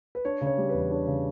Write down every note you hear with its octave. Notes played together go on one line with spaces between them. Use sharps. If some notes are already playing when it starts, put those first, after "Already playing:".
B4
D4 C#5
C#3
C#5
G3
E2 B4
D4 C#5
C#3